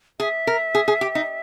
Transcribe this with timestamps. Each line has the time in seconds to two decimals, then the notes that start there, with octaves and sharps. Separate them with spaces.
0.20 G#4 E5
0.47 A#4
0.75 G#4
0.88 G#4
1.01 G4
1.15 D#4